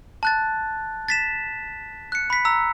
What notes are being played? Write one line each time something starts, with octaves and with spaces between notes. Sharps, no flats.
A5 F#6 A6
A6 B6 E7
F#6 C#7
B5 B6
A#5 E6